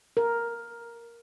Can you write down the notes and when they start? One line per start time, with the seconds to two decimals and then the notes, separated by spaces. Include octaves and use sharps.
0.17 A#4